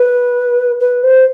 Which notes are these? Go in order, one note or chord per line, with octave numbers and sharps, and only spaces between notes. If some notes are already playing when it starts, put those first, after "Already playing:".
Already playing: B4
B4
C5